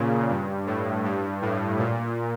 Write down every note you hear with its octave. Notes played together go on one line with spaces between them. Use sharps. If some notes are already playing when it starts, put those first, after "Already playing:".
Already playing: A#2 C#3
G2
A2
G2
A2
A#2